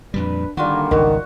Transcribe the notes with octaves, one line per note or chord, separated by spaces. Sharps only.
F2 A#2 G3 D4 B4
D3 D#3 G3 A#3 F4 F#4
G#1 C#2 D#3 F#4